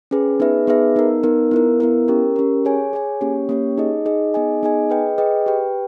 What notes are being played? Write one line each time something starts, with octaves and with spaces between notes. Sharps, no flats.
C#4 G#4 B4
B3 D#4 G#4 B4 E5
B3 D#4 G#4 B4 E5
B3 D#4 A#4
B3 D#4 A#4
B3 E4 A#4
B3 E4 A#4
C#4 G4 A#4
C#4 G4 A#4
G#4 C#5 G#5
G#4 C#5 G#5
A#3 C#4 G4 C#5
A#3 C#4 G4 C#5
D#4 G#4 D#5
D#4 G#4 D#5
B3 D#4 G#4 D#5 G#5
B3 D#4 G#4 D#5 G#5
G#4 B4 D#5 G5
G#4 B4 D#5 G5
G4 B4 G5